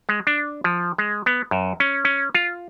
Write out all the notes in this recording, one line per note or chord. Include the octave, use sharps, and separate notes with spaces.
G#3
D4
F3
G#3
B3
F#2
C#4
C#4
F4